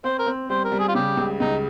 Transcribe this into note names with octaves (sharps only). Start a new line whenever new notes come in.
C4 C5
A#4
C4
G3 C5
A#4
G3
G#4
F4
C#3 G4
C#2
C#2 D#4